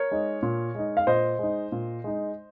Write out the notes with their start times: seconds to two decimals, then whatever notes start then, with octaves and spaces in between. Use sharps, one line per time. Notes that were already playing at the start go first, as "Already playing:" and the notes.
Already playing: A#4 C#5
0.11 G#3 D#4
0.42 A#2
0.75 G#3 D#4
0.97 F5
1.07 A#2 C5 D#5
1.39 G#3 D#4
1.72 A#2
2.04 G#3 D#4